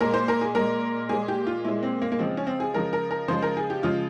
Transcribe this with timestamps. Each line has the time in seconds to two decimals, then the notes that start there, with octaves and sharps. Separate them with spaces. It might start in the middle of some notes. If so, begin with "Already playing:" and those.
0.01 A#2 G#3 A#4
0.14 C5
0.28 A#4
0.41 G#4
0.55 A#2 G#3 A#4
1.09 A#2 G#3 G#4
1.28 G4
1.47 F4
1.65 A#2 G#3 E4
1.83 C4
2.02 A#3
2.12 A#3
2.19 C#3 F3 G#3 C4
2.37 C#4
2.47 C4
2.60 G#4
2.74 C#3 F3 G#3 A#4
2.93 A#4
3.11 A#4
3.28 C#3 F3 G#3 C5
3.42 A#4
3.57 G#4
3.70 G4
3.83 C#3 F3 G#3 F4